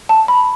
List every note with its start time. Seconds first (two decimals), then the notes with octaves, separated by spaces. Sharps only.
0.09 A5
0.28 B5